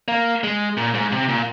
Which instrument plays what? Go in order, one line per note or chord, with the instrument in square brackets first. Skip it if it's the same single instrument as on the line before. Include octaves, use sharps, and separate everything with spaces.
[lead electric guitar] A#3
G#3
A#2
G#2
C3
A#2